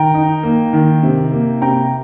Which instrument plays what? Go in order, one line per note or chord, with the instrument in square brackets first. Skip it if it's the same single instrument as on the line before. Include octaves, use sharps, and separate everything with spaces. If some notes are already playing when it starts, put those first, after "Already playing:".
Already playing: [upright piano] D#3 G5 A#5
D#4
A#3
D#3
C3
A#3
C3 G5 A#5